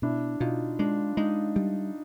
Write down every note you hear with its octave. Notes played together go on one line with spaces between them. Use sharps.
B2 D4 E4
B2 D#4 F4
G#3 D4
G#3 D#4
G3